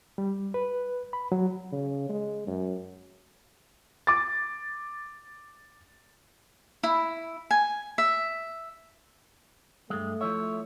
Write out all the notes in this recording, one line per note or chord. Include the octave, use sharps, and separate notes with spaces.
G3
B4
B5
F#3
C#3
G#3
F#2
D6 A6
E4
G#5
E5
G2 G#3 A3
F3 E4 C#5 E5